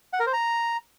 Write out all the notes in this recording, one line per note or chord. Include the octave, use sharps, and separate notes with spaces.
F#5
A#4
C5
A#5